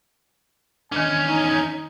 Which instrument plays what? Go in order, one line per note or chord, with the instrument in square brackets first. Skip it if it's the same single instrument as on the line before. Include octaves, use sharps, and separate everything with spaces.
[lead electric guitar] E2 C#4 [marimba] D#3 D4 [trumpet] G#5
[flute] D#4